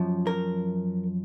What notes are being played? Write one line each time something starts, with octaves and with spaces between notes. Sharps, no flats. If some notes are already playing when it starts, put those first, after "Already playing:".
Already playing: F#2 F3
A#4